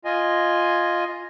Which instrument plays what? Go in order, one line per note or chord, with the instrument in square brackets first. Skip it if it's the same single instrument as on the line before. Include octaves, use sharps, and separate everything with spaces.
[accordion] F4 D#5 G#5